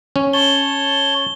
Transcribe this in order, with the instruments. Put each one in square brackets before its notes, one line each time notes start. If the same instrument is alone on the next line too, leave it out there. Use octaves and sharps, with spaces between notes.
[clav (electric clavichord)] C#4
[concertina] C#5 A5 [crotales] G7